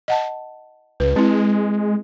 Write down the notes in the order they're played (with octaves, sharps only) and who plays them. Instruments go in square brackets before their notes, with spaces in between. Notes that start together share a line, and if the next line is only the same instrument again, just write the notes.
[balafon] D#5 F#5 A5
[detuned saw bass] C#2 [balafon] B4
[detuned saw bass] G#3 [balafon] C4 E4